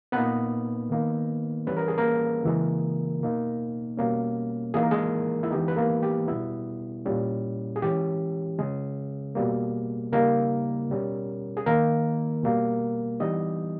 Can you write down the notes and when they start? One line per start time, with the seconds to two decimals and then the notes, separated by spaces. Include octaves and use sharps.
0.12 A#2 A#3 B3 D#4 B4
0.90 D#3 A#3 D#4
1.67 E3 G3 C#4 B4
1.77 A#4
1.88 G#4
1.98 A#3 A#4
2.43 C#3 E3 G#3
3.20 B2 A#3 D#4
3.97 B2 G3 A#3 C#4
4.74 E3 A#3 D#4 G#4
4.83 A#4
4.91 G#3 G#4
5.43 E4
5.51 E3 G#3 B3 D#4 G4
5.68 B4
5.76 A#3 A#4
6.03 G4
6.28 B2 G3 B3 E4
7.06 A#2 G3 C#4
7.76 G#4
7.82 E3 G#3 C#4 G4
8.58 C#3 G#3 C#4 G#4
9.35 B2 G3 A#3
10.12 C#3 G3 A#3 D#4 A#4
10.89 B2 G3 C#4
11.57 G#4
11.66 D#3 A#3 D#4 A#4
12.43 B2 G3 A#3
13.20 E3 G3 B3 D#4 D#5